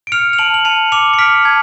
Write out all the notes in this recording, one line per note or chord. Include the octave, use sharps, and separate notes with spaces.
D7
F6 C#7 F7
F7
A5 D7 F#7
F#7
A5 C#7 F7
D6 C#7 F7
C#7
F6 B6 D7
A5 G#6